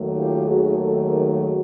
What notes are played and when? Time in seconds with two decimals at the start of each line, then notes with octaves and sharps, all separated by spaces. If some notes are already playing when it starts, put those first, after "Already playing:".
Already playing: D#2 D#3 F#3 A3
0.17 F4 G4
0.46 F#4 G#4
0.75 G4 A4
1.04 G#4 A#4
1.32 F#4 G#4